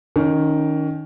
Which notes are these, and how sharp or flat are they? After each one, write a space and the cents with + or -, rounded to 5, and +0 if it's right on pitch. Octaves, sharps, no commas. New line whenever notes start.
D#3 +0 C#4 +25